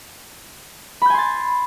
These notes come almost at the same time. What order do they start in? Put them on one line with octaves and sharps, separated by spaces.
B5 G6 G#5 C6 A6